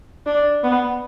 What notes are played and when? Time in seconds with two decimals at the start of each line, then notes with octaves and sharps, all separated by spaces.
0.26 D4
0.64 B3